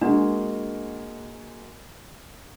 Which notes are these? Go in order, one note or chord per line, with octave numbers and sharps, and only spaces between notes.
G#3 A#3 D4 F#4